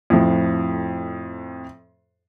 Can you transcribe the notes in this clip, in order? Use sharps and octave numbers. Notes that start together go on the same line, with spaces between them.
F2 A2 F3